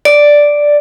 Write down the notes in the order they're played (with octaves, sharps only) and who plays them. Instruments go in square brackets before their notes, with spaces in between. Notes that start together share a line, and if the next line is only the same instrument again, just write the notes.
[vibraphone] D5